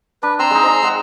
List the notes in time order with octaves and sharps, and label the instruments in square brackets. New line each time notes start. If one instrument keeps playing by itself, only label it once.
[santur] D4 [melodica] B4
[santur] C4 [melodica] A#5 C6 E6
[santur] G#3 D#4
C5 D#5
G#3 F#5